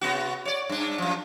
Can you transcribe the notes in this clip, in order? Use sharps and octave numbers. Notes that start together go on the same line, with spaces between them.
C3 B3 F#4
C#5 D5
G2 D4
F#2 F3